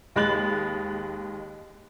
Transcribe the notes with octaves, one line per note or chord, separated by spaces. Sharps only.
D#2 G#3 B5 F#6 A6 F#7